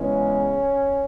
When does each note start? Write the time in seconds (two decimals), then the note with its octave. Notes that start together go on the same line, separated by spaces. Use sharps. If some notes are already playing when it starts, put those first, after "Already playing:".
Already playing: E2 C#3 E3 G#3 C#4